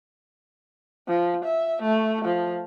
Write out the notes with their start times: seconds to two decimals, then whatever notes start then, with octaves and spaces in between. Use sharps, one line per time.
1.07 F3
1.45 E5
1.82 A3
2.25 F3